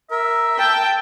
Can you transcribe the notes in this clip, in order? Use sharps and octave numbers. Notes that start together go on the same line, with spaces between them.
A#4 E5
G5 A5